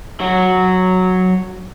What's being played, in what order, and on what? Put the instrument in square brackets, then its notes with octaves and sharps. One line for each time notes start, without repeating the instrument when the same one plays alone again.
[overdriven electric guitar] F#3 F#4